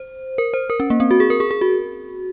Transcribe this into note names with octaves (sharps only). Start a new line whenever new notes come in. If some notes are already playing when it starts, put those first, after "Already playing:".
Already playing: C5
A#4
C5
A#4
C#4
A#3
C4
F#4
G#4
A#4
G#4
G#4
F#4